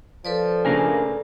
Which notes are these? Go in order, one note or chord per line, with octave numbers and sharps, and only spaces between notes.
F3 A4 B4 D5
C#3 A3 A#3 D4 A#4 G#5